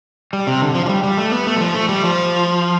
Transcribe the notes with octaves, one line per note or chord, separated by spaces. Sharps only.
G3
C3
D3
F3
F3
G3
G3
A3
B3
A3
G3
F3
A3
G3
F3